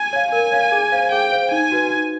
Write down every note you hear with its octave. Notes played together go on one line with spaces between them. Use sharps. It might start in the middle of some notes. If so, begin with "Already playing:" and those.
Already playing: G#5
C#5 F5
A#4 G#5
C#5 F5
G#4
C5 F5
G#4 G5
C5 F5
D#4 G#5
F#4 B4
D#4